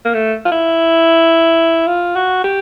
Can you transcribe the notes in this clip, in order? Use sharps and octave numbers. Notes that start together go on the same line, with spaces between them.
A#3
A3
F4
E4
F4
F#4
G4